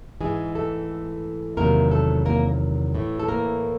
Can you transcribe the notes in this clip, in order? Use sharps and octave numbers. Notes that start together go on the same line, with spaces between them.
G#2 E3 G#3 G#4
A3 A4
E2 C3 D#3 F#3 A#3 A#4
A3 A4
A#3 A#4
A2 E3
A4
A#3 A#4